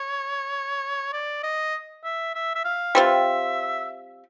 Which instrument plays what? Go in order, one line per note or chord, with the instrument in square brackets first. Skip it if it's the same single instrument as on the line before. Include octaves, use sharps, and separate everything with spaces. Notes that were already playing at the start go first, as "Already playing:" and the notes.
Already playing: [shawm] C#5
D5
D#5
E5
E5
E5
F5
[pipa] G3 C4 F4 [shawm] E5